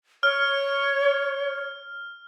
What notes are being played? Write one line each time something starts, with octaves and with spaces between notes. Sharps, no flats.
C#5 F6